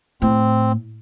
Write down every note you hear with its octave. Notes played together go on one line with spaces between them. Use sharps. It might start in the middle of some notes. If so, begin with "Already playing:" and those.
A2 C4